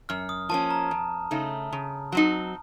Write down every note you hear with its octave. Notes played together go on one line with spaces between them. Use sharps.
F#2 F6
D#6
F3 A#3 C#4 A5
A#5
F2
C#3 A3 D#4
C#3
F#3 C4 D#4